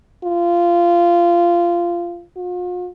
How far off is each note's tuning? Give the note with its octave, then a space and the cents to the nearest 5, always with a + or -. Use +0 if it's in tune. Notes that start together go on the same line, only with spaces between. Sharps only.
F4 -15
F4 +45